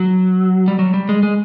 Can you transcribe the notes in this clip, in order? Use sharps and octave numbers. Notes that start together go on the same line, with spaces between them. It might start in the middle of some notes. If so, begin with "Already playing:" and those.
Already playing: F#3
G3
F#3
G3
G#3
G#3